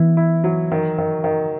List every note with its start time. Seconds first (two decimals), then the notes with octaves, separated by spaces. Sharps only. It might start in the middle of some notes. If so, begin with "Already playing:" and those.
Already playing: E3 B3 E4
0.17 E4
0.44 F#3
0.72 D#3
0.98 D#3
1.24 D#3